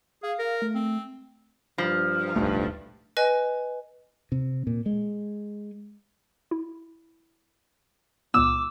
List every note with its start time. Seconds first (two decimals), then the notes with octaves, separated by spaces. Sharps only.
0.23 G#4 F5
0.39 A#4
0.62 A3
0.75 C4
1.78 G2 F3
2.36 D1 B1 G2 A3
3.17 B4 D#5 G#5
4.32 C3
4.67 A#2
4.86 G#3
6.51 E4
8.34 C#2 A#2 B3 D6 E6